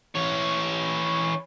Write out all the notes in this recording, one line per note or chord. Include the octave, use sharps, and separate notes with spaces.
E3 C#5